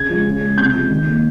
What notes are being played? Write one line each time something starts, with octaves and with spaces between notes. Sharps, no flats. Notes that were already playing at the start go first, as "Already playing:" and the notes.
Already playing: C#3 G#6
F3 G#3
C#3
G#3
C3 G6
F3 G#3
D#3
A#3